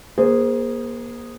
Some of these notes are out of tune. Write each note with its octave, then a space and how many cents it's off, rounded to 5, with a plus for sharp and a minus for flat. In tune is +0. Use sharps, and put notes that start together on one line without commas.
A#3 +30 G#4 -10 C5 +0